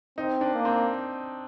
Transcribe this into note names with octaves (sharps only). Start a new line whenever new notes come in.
C4 D#4
D4
A#3
C4